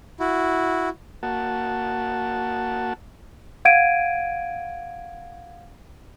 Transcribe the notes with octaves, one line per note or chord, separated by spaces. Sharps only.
E4 F#4
A#3 F#4 F#5 A5
F5 F#5 G#6 D7 D#7